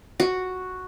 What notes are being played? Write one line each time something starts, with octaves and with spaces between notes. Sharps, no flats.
F#4